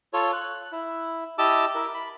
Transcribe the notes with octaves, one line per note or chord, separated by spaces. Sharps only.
F4 A4 C#5
F#6
E4
E4 G4 D#5 A5 D6 E6
E4 A#4
B5